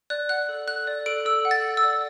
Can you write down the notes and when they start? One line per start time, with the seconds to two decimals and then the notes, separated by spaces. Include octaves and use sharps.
0.10 D5 F#6
0.29 F#5 F#6
0.49 A4
0.68 A4 F#6
0.87 D5
1.06 A4 D7
1.25 A4 E6
1.45 F#5
1.51 A6
1.64 F#5
1.77 E6
1.83 D5